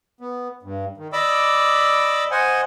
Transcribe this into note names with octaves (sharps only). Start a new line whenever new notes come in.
B3
G2
D#3
D5 D#5 B5 D6 E6
C5 D#5 F#5 G#5